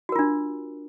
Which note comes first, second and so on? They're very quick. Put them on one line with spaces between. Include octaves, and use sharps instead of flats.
F#4 A#4 F4 D4